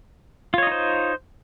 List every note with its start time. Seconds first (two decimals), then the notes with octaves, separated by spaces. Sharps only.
0.54 F4
0.58 C#5
0.63 D#5
0.67 D#4
0.71 C5